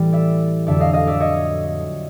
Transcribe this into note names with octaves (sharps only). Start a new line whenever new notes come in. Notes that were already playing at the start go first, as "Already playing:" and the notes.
Already playing: A2 E3 G3
D5 E5
F2 D3 F#3 D5 E5
D#5 F5
D#5 F5
D5 E5
C#5 D#5